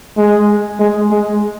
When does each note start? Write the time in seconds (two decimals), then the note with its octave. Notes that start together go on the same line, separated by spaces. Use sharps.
0.17 G#3
0.80 G#3
1.11 G#3